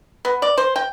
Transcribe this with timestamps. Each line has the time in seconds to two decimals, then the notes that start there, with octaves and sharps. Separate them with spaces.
0.25 B3
0.42 D5
0.58 C5
0.76 G5